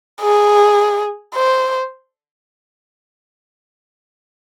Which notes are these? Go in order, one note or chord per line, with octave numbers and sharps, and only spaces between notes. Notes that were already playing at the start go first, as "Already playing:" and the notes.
G#4
C5